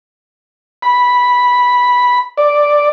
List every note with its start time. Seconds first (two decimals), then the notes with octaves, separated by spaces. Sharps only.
0.82 B5
2.38 D5